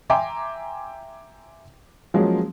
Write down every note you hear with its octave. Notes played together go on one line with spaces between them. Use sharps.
E5 G5 G#5 A#5 C6 D6
F3 F#3 G#3 A#3 C#4